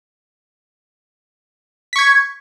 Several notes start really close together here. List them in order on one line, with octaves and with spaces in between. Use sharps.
B6 C#6 G#6